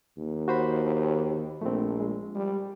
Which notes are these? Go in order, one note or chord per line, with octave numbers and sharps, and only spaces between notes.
D#2
F#4 C5 B5
A#1 A3 C4
G#3
G3